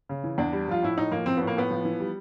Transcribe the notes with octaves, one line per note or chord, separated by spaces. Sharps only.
C#3
E3
E2 D4
G3
F3 F4
A2 E4
A2 D#4
F3 A#3
F3 C4
A2 B3
A#3
A2 B3
F3
E3
G3